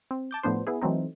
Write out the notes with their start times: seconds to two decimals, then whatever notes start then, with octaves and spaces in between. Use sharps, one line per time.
0.11 C4
0.31 A5 D6 G6
0.43 A2 F3 B3 D4 C5
0.67 B3 E4 G#4
0.82 E3 F#3 A3 C4 D#4